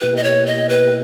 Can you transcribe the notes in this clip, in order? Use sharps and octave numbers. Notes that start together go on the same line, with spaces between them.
B2 A#3 E4 G4 B4
D#5
C#5
D#5
B4